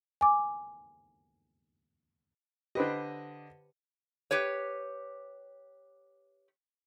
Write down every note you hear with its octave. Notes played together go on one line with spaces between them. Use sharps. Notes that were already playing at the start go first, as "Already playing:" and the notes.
G#5 D6
D3 G4 B4 C5 D#5
G4 B4 C#5